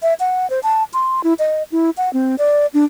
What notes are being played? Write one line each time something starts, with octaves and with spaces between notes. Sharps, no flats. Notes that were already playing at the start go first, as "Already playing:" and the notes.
E5
F#5
C5
A5
C6
E4
D#5
E4
F#5
C4
D5
D4